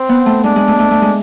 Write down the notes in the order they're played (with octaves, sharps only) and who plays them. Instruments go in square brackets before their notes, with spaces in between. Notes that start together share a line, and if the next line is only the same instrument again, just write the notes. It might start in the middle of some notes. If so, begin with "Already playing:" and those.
Already playing: [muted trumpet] C4
[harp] B3
A3
[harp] G#3 [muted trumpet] D4
[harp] G#3
A3
A3
A3
G#3